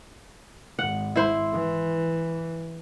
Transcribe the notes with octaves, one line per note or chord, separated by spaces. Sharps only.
G#1 F#5
E4 C5
E3